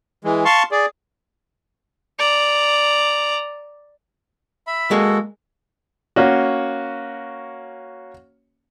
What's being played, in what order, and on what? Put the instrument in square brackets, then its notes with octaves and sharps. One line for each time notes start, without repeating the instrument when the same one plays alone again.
[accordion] E3 G#3
F5 A5 C6 C#6
G#4 D5
[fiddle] D5 A#5
[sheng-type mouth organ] E5 B5
[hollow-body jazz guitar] G#3 A#3 G#4 [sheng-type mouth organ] F#4 A4
[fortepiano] A#3 C#4 F#4